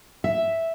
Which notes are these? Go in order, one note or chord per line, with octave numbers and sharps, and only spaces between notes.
E5